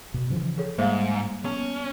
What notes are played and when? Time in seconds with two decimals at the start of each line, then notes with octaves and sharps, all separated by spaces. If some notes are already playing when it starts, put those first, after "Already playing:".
0.14 B2
0.30 C#3 E3 F3
0.58 G#4 A4 C#5
0.78 G#2 G3 A#3 C5 E5 F5
1.45 B3 C#4